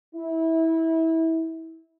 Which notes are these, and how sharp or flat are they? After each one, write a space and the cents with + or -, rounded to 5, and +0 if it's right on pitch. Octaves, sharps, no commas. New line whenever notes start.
E4 -25